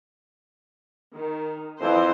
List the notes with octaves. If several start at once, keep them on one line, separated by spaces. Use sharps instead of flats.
D#3
F2 E3 C5